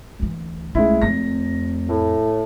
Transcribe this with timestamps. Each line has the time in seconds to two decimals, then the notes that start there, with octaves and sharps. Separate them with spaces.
0.19 D2 E3
0.75 C2 G#3 A3 C#4 E4
1.02 F2 F3 A3 C4 A#6
1.89 A2